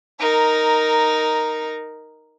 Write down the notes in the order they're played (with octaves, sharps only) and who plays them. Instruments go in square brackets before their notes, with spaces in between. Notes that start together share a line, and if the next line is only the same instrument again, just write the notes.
[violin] D#4 A#4